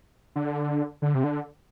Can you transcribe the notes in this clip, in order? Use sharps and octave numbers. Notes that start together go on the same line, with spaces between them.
D3
D3
C3
D3